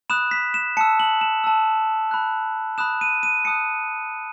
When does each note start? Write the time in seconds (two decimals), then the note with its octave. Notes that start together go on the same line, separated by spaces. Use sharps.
0.10 B5 D#6 F#6 E7
0.31 B6
0.54 E7
0.77 A5 C#7
0.81 E6
1.00 F#7
1.21 E7
1.44 A5 E6
2.11 B5 F#6
2.78 B5 D#6 F#6 E7
3.01 D#7
3.23 D#7
3.45 A5 D#6 F#6 C#7